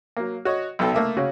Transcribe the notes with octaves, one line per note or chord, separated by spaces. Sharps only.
F#3 A#3
F#4 C#5 D#5
B1 B2 F#3 A4 G5 B5
A3 A#3 E5
C#3 C#4 F#4